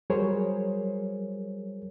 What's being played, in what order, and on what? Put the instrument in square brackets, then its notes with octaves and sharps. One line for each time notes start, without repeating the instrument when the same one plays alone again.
[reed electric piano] F#3 G3 G#4 A#4 C5 C#5